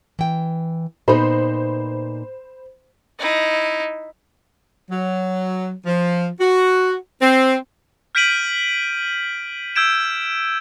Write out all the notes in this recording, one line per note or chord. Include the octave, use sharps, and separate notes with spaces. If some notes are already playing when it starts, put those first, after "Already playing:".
E3 G5
A#2 B3 D#4 C5 B5
D#4 E4
F#3
F3
F#4
C4
F6 G6 B6 D7 D#7 F#7
E6 G6 G#6 D7 E7